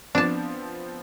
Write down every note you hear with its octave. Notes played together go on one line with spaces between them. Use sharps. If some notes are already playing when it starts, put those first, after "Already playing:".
F3 B3 C4 D4 A5